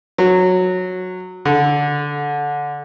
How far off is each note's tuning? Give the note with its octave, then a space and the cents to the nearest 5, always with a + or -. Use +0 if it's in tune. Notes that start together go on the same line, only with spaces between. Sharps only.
F#3 -15
D3 -10